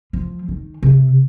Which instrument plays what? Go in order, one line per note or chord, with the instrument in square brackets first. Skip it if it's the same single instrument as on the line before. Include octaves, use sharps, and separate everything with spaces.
[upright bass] F3
D#3
C3